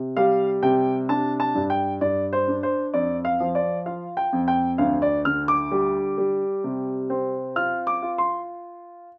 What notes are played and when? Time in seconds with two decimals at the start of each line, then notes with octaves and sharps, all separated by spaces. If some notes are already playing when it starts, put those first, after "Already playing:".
Already playing: C3
0.17 G3 F5
0.63 C3 G5
1.09 D4 A5
1.40 A5
1.55 G2
1.70 G5
2.01 G2 D5
2.33 C5
2.48 D4
2.63 C5
2.94 F2 D5
3.25 F5
3.40 F3
3.55 D5
3.86 F4 F5
4.17 G5
4.33 F2
4.48 G5
4.78 D2 F5
5.02 D5
5.25 D3 F6
5.48 D6
5.71 G3
6.18 G3
6.64 C3
7.10 C4
7.56 F4 F6
7.87 D6
8.02 F4
8.18 C6